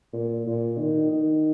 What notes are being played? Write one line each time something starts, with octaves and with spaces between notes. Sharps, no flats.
A#2
A#2
D#3
D#3